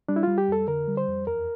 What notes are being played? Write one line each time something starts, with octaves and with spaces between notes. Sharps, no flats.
G3 D4
E4
G3 F4
G4
F2 A4
D3 A#4
G3
C5
F2
E2 A#4